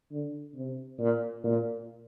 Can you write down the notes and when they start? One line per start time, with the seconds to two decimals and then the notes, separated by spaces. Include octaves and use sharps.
0.12 D3
0.55 C3
0.99 A#2
1.44 A#2